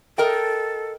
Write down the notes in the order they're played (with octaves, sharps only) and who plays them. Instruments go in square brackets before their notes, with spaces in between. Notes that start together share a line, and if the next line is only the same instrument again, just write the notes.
[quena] A4 [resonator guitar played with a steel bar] A#4 D#5 G5